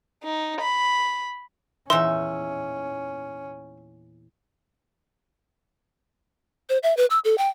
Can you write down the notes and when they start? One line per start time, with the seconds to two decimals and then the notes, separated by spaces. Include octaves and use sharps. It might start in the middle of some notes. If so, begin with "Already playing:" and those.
0.24 D#4
0.60 B5
1.90 E2 A#2 C#4 D#4 E5 C6
6.69 C5
6.83 E5
6.97 B4
7.10 E6
7.25 A4
7.38 G5